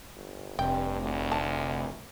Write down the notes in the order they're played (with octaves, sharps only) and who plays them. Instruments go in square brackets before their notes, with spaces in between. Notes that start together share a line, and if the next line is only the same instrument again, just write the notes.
[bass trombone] G1
[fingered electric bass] F1 C3 [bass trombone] G2 [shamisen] G5
[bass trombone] D2
[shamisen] A5